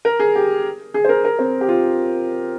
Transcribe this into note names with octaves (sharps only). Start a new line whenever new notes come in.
A#4
G#4
G4
G#4
C5
A#4
A#4
C4
G4
F4